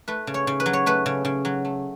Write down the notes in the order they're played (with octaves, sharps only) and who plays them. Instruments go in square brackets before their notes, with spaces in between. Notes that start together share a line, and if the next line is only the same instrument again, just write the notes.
[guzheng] A3 B4
C#3
C#5
C#3
B4
F#3
C#5
A3 B4
C#3
C#3
F#3
A3